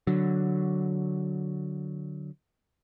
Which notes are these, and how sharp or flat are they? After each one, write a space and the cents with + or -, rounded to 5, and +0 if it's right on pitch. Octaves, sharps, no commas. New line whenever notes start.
D3 +0 F#3 +0